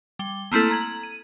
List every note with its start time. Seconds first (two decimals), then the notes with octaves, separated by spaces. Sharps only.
0.19 G3 G7
0.52 A3 A#3 C4 E4 A4
0.70 A#5 G#6 F#7
1.03 D#7